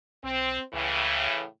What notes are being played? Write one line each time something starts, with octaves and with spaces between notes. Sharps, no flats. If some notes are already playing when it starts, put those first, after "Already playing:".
B1 C4
C#2 A2 C#3 E3